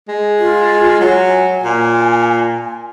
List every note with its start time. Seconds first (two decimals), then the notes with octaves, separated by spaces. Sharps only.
0.08 G#3
0.40 F4
1.00 F#3 G#5
1.64 A#2